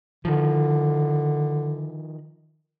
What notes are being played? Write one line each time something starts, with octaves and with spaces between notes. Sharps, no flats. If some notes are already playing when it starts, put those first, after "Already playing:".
D3 D#3 F3